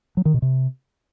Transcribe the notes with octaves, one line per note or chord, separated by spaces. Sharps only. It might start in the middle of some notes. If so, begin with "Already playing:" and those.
F#3
D#3
B2
C3